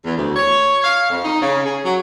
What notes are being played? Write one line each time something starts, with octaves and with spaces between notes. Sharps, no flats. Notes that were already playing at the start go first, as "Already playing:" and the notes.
E2
D2
C#5
F5
F2
D#4
C#3
G#4
F#3